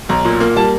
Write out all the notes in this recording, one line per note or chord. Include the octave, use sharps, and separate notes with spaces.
B1 A#5
A#2
A#3
G3 A5